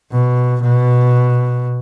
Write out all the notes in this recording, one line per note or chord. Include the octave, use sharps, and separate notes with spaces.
B2
B2